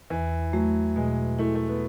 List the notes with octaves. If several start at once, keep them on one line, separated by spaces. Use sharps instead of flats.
E2 E3
F#3 A3
B2 G#3
A3 E4
A3
B3